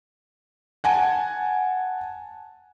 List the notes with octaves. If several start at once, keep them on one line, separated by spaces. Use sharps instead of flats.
F#5 G#5 A5